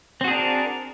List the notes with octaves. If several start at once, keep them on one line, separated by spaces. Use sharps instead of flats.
C4 D4 F#4 G#4 A#4